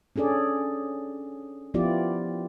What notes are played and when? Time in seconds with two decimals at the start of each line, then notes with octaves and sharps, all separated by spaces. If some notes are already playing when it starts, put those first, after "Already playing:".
0.16 C#4 D4 G#4 A4 D5
1.74 F3 B3 E4 F4 G4 D5